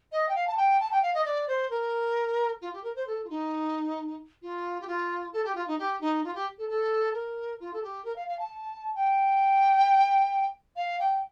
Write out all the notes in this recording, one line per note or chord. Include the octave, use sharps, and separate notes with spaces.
D#5
G5
F5
A5
G5
A5
G5
F5
D#5
D5
C5
A#4
F4
G4
A#4
C5
A4
F4
D#4
F4
G4
F4
A4
G4
F4
D#4
G4
D#4
F4
G4
A4
A4
A#4
F4
A4
G4
A#4
F5
F5
A5
G5
F5
G5